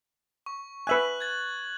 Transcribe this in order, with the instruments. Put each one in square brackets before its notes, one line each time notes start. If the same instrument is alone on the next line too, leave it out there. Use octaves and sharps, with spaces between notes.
[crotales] C#6
[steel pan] B4 E5 G#5 [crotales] F#6 F#7
[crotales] G#6 A6 F#7